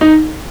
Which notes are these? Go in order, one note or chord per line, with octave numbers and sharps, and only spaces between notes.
D#4